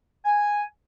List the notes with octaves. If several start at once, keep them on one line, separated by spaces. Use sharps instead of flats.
G#5